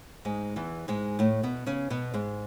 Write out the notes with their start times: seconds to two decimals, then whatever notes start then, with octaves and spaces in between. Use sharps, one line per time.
0.25 G#2 G#3
0.56 E2 E3
0.88 G#2 G#3
1.19 A2 A3
1.43 B2 B3
1.66 C#3 C#4
1.90 B2 B3
2.14 G#2 G#3